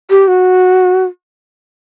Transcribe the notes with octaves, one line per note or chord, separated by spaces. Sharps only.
G4
F#4